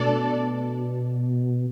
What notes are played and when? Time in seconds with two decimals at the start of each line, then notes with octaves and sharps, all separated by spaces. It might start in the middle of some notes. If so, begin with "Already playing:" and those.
Already playing: B2 A3 D4 A4 D5